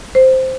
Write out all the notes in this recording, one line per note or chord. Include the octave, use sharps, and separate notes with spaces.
C5